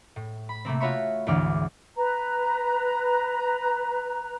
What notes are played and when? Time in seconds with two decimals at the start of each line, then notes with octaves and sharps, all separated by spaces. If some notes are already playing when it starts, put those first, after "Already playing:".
0.16 A2
0.49 B5
0.65 C3 A3 A#3 C4
0.80 F4 F#4 C#5 E5 B5 C#6
1.27 G#1 D2 E3 D5 F6
1.97 B4 A#5